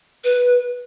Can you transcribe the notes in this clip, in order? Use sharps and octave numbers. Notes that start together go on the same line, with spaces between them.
B4